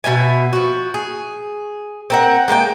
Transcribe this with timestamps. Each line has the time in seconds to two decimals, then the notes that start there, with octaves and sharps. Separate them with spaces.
0.04 B2 C4 E5 G#5
0.53 F3 F#4
0.94 G#4
2.10 C4 A#4 F#5
2.48 G#3 A#3 F#5 G5